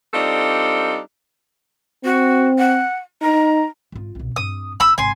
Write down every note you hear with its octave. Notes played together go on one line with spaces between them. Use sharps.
G3 C4 D4 D#4 F4 A4
C4 F#4
F#5
D#4 A#5
G#1 F4
C2 B2
G2 C4 D#6
F1 D#4 B5 E6
G#1 C3 G#5 C6